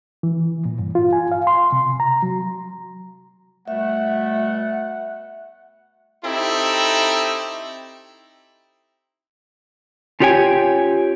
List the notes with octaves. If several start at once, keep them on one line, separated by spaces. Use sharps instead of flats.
E3
A#2
G2
F4
G#5
F5
C6
C3
A#5
F#3
B2 G3 A3 E5 F#5
C4 D#4 E4 G4 A4
C#4 F4 G4 C#5 G5 G#5